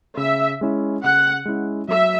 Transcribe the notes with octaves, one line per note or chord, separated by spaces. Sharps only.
C#3 E5
G#3 C#4 E4
C#3 F#5
G#3 C#4 E4
F#3 E5